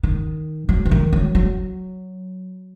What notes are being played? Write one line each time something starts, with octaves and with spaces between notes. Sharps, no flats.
D#3
F#3
E3
D#3
F#3
F#3